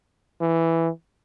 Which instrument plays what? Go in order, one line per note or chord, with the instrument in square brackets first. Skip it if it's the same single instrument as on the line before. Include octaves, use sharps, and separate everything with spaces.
[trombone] E3